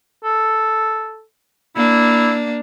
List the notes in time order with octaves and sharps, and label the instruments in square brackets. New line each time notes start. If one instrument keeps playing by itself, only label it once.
[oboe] A4
[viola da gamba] A#3 D4 [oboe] E4